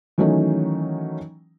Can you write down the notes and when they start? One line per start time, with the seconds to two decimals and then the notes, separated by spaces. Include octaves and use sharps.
0.18 D#3 E3 F#3 A3 C#4 D#4